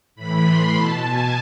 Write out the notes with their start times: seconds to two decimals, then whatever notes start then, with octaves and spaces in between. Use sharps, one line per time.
0.16 A2 E3 B5
0.45 C6
0.74 B2 A5
1.02 G#5